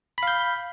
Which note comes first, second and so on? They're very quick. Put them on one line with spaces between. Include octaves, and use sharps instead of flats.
B5 F5 G6